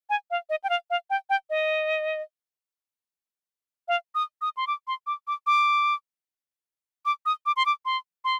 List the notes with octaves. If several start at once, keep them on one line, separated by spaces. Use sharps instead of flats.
G#5
F5
D#5
G5
F5
F5
G5
G5
D#5
F5
D#6
D#6
C6
D6
C6
D6
D6
D6
D6
D#6
D6
C6
D6
C6
C6